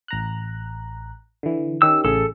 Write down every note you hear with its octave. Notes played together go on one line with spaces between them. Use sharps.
A1 A#5 F#6
D3 E3
D#3 C#4 G4 E6
A1 C#3 G#4 A4